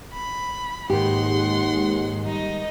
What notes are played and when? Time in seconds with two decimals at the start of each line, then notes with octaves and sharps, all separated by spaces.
0.13 B5
0.90 D#2 G#2 D#3 G#3 G4 F#5 C6
2.26 G3 D#4 D#5